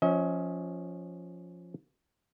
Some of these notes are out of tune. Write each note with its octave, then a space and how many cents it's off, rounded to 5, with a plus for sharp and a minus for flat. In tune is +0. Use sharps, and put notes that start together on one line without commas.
F3 +5 C#4 +0 D#5 +45